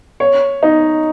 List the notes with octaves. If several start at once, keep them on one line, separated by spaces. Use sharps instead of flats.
C#5
D#4